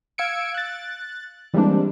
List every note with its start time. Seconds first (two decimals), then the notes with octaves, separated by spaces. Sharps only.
0.18 F5 E6 G#6 C#7 D7
0.54 F#6 A6
1.54 E3 G3 G#3 A#3 C4 D4